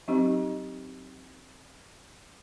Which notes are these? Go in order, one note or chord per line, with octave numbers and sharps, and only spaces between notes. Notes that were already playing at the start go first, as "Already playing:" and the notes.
F#3 C4 D#4 G4 D#5